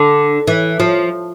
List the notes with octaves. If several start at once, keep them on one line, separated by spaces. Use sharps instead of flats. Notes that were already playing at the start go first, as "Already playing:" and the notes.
Already playing: D3
E3
F3